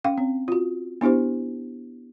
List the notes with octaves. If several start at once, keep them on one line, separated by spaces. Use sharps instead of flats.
C#4 F5 G5
C4
F4 F#4
B3 D4 E4 G4 C5